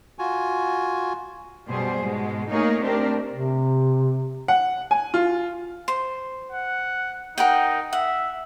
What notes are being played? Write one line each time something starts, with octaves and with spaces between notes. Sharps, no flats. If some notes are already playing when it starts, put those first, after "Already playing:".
F4 F#4 G#5
F#2 B2 G3 G#4 C5
G#2 B2 G#3
A3 A#3 D#4 G#4 A#4 C#5
A3 C4 D4 G4 A#4
C3
F#5
G#5
F4
C5
F#5
D#4 A#4 F#5 G5
E5 F#5